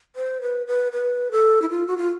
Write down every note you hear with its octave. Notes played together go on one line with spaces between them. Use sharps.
C5
B4
B4
B4
A4
E4
F4
F#4
F4